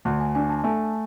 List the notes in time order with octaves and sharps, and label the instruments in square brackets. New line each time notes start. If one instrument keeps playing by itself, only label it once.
[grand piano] D2 [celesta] F#5
[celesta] G#5
[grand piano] D4 [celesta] G#5
[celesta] A5
[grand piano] A3 [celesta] G#5